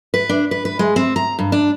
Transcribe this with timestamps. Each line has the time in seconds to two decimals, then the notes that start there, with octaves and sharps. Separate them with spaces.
0.14 B4
0.29 D4
0.51 B4
0.65 B4
0.79 G#3
0.96 C4
1.16 A#5
1.39 G2
1.52 D4